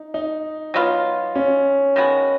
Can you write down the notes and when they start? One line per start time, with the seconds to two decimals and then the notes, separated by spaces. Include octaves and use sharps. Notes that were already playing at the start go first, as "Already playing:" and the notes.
Already playing: D#4
0.14 D#4
0.74 F#3 B3 F4
1.35 C#4
1.96 D#3 G#3 B3 F#4